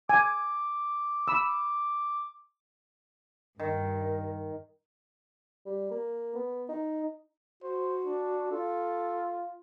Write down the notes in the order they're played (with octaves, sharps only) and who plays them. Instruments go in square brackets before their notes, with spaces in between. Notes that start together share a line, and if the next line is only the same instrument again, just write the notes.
[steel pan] G#5 [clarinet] D6
[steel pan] B5 E6
[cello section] G2 [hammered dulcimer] D#3 [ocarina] A#4
[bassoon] G3
A#3
B3
D#4
[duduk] F#4 [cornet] C5
[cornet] D4
[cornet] F4 [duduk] A4